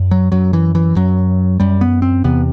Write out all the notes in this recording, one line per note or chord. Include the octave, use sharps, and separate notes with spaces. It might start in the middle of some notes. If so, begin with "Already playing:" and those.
Already playing: F#2
F#3
F#2 F#3
E3
E3
F#2 F#3
F#2 G3
B3
C4
E2 C3 B3